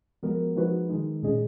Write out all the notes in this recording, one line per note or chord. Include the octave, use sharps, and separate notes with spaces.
F3 G#3 B3 F#4 A#4
F3 G#3 D#4 F#4 B4
D#3 G#3 D#4
A#2 G#3 C#4 G#4 D#5